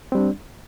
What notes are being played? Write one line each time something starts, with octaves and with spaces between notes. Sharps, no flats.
G3 C4 D4